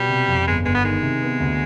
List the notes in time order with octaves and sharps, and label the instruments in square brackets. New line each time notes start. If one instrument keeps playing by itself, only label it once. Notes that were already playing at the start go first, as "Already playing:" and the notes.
Already playing: [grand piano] B2 [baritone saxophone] G3
[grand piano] C3
F2
[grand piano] G1 [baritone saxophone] G#3
[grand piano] G1 [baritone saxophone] G#3
[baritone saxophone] B3
[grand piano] D#3 [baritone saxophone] G#3
[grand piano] C3
B3
D2